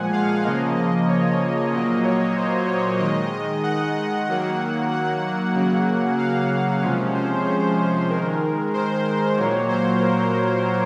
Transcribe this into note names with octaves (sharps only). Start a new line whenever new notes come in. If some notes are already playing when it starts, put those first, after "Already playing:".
Already playing: A#2 F3 G#3 F#5 G#5
F5
C#3 F3 A#3 D#5
D#5
C#5
A#2 F#3 A#3 D#5
C#5
C5
C#5
D#3 G#3 D#5
D#5
F#5
D#3 F#3 A#3 F#5
F#5
C#3 F#3 A#3
F5
C3 F3 G#3 C#4
C5
C5
D#3 G#3 A#4
C5
A#2 F#3 A#3 C#5
C5
A#4